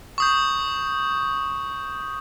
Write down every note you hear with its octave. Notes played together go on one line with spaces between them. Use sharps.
C#6 D#6 G6